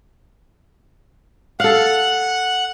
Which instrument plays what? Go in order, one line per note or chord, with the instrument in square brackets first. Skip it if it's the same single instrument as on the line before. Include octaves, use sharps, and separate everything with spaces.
[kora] A4 F5 [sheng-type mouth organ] F#5